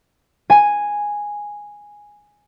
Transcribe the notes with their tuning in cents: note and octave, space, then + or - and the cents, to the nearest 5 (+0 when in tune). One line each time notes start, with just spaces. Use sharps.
G#5 -5